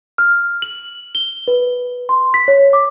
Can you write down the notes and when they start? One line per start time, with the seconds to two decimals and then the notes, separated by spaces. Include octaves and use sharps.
0.18 F6
0.62 F#7
1.15 G7
1.48 B4
2.09 C6
2.34 B6
2.48 C#5
2.73 D6